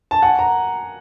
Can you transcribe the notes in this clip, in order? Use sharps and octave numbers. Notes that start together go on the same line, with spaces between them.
A5
F#5 G#5
A#5